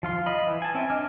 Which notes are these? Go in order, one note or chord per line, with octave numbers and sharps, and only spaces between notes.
F3 F4 C6
D#5 B5
E3
G#5 A5
C4 C#4 E5 G5 G#5
D4 D#5 D6 F6